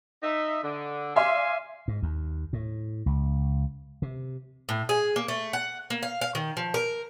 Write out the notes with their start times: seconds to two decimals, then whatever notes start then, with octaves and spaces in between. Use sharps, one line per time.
0.22 D#4 E5
0.62 D3
1.16 D5 E5 F5 G#5 C6
1.88 G#2
2.03 D#2
2.53 A2
3.06 C#2
4.02 C3
4.69 A2
4.89 G#4
5.16 A#3
5.28 A3
5.53 F#5
5.90 A#3
6.03 F5
6.21 F5
6.35 D#3
6.57 F3
6.74 A#4